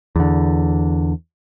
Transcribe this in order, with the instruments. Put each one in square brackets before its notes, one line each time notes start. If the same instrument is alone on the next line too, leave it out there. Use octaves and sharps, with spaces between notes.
[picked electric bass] E2 D3